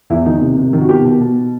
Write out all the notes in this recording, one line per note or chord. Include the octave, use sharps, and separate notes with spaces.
E2 E4
D#3 D#4
C3
C3
D#3
F#4
B2 G4
B2
B2